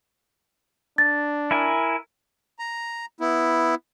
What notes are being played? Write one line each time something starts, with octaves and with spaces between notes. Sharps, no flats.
D4 A6
E4 A#4 G#5
A#5
B3 E4